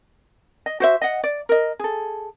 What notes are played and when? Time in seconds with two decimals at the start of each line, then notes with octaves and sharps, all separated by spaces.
0.66 D#5
0.80 F#4 C5 E5
1.02 D#5 F#5
1.24 D5
1.49 A#4 D#5
1.79 G#4 A4